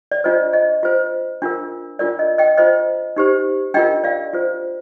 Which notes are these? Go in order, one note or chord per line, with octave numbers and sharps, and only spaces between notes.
D5
D4 F4 C5 D#5
D#5
F4 C5
D4 F4 A#4
D4 F4 A#4 D5
D#5
D#5 G5
F4 C5 D#5
D#4 G4 C5
D4 F4 A#4 D#5 G5
D5 F5
F4 C5